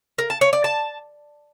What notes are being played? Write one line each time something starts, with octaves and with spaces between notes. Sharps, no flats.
A#4
A5
C#5
D5
A5